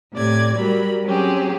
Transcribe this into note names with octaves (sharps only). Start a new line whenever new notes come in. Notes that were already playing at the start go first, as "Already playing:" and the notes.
A2 C3 D5 G#6
F#3 G3 A#4 B5
F#3 C4 C#4 G4 G#4